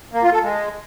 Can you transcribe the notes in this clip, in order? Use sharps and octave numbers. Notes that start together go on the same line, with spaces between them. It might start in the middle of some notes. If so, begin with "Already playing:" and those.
A#3
F4
A4
G#3